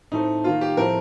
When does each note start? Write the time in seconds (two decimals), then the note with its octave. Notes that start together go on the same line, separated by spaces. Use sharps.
0.12 A2 A3 C4 D#4
0.44 D#3 A#3 F4
0.61 G4
0.77 A2 F3 A3 C4 A#4